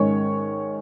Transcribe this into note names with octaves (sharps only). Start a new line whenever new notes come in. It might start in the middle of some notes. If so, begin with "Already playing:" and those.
Already playing: G#2 D#3 G#3 C#4 C#5